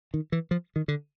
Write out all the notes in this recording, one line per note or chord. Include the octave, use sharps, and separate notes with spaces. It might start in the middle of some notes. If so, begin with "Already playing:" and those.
D#3
E3
F3
D#3
D3